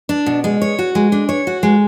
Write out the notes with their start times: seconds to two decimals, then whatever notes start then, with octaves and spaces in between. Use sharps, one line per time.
0.09 D4
0.26 B2
0.44 G#3
0.62 C#5
0.79 F#4
0.95 G#3
1.12 D4
1.29 C#5
1.47 F#4
1.63 G#3